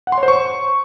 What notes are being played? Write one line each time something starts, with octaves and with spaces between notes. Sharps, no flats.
F#5
C6
C#5
C5
C#6